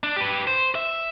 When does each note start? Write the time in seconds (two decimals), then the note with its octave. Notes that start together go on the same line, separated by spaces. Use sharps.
0.03 D4
0.16 G4 B4
0.47 C5
0.75 E5